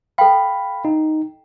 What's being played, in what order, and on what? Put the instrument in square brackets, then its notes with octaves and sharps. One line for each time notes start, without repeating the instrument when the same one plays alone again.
[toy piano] A4 G5 [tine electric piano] F5 B5
[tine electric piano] D#4